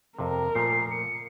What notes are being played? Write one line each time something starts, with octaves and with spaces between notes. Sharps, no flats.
F2 C3 A#4
A#2 F3 A3 C7
C#7